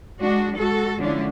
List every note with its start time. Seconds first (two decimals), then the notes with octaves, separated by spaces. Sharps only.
0.20 G#3 D4 F#4
0.54 G#3 F#4 A4
0.99 D3 F3 G#3 C#4 D4 E4